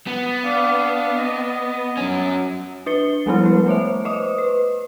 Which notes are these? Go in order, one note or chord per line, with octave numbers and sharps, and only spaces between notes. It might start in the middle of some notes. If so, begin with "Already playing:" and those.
B3
D4 F5
D#5
F#2 C#4
D4 B4 A6 C#7 G7
F3 G3 G#3 A#3 B3 E4
G#3 B4
A3 C5 C#5 E5
B4 C5 D#5 E5 D6 D#6
B4